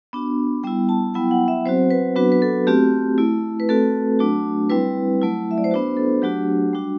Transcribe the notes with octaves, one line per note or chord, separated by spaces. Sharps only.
B3 D4 F#4
G3 B3 E4 G5
A5
F#3 B3 E4 G5
F#5
E5
F#3 C4 F#4 C5
B4
F#3 B3 D4 F#4 B4
B4
A4
A3 C4 F#4 G4
A3 E4
B4
A3 C4 F#4 A4
F#3 A3 D4 F#4
G3 C4 E4 B4
F#3 A3 E4
E5
D5
C5
B3 D4 F#4 B4
A4
F#3 A3 D4 F#4 G4
G3 D4 F#4